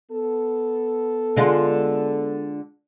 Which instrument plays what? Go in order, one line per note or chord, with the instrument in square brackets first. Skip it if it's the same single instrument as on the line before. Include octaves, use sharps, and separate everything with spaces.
[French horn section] B3 A4
[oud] D3 G#3 F4